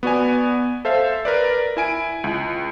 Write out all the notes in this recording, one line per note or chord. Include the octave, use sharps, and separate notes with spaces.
B3 F#4 D5 G#5
A4 C5 E5 F5
A#4 B4 D5
E4 G#5 D7
C#2